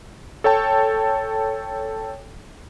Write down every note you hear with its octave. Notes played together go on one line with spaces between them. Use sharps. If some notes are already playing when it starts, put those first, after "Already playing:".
A4 C#5 G5 A5